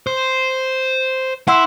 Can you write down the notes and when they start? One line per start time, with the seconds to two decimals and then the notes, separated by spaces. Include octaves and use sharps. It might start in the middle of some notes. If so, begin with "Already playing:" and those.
0.07 C5
1.48 E4 F#5 C6 E6